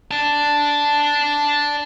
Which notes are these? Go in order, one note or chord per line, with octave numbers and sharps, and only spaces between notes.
D5 A5